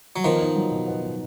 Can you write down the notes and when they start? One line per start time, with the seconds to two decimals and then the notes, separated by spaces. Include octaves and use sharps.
0.16 F#3
0.24 D#3 F3 B3
0.40 D#4
0.56 F#3
0.71 B2
0.87 B3
1.02 D#4